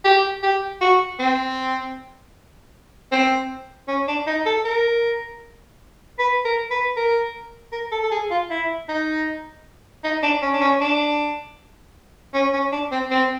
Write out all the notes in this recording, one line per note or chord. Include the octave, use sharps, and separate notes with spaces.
G4
G4
F#4
C4
C4
C#4
D4
D#4
A4
A#4
B4
A#4
B4
A#4
A#4
A4
A4
G#4
F4
E4
D#4
D#4
D4
C#4
D4
C#4
D4
C#4
C#4
D4
C4
C4